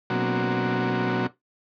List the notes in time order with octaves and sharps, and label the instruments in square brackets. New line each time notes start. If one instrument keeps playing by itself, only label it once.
[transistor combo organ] B2 F#3 A#3 C4 D4 F#4